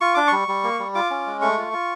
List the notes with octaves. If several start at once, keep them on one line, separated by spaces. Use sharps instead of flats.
F4 C#6
D4 D6
G3 C#6
G3
A#3
G3
F4 D6
C#4
G#3
A3 C#6
F4
F4